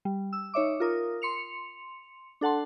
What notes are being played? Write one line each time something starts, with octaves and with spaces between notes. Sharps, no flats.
G3
E6
D#4 C#5 E5 D6
F4 A#4 D#6
C6 C#7 F7
D4 A4 F#5 A5 C6